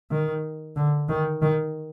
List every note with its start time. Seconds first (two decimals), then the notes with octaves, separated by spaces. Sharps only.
0.11 D#3
0.76 D3
1.09 D#3
1.42 D#3